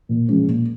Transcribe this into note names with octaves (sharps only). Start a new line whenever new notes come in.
A#2
F3 G#3 C#4
A#2